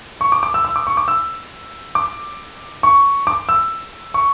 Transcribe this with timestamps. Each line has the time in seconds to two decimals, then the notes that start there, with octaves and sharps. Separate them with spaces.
0.21 C#6
0.32 D6
0.43 D6
0.54 E6
0.65 E6
0.76 D6
0.87 C#6
0.97 D6
1.08 E6
1.95 D6
2.83 C#6
3.27 D6
3.49 E6
4.14 C#6